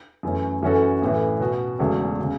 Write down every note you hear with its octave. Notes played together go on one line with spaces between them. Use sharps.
F#2 E3 A3 C#4
F#2 E3 C#4 F#4 A4
A1 A2 E3
B2 B3 F#4
E1 E2 C#3 A3 F#4
C#3